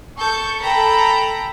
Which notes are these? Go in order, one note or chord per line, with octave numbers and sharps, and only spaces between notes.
A4 C#6 G6
A4 G5 A#5 B5